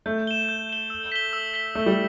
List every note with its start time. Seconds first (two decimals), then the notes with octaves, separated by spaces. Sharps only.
0.06 A3 G6
0.27 E7 G7
0.49 G6
0.69 E7 G7
0.90 E6
1.12 B6 G7
1.33 E6
1.54 B6 G7
1.75 A3 E6
1.86 G3